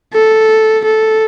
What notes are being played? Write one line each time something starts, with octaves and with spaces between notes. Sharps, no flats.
A4
A4